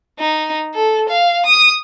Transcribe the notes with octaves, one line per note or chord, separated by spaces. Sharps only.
D#4
A4
F5
D#6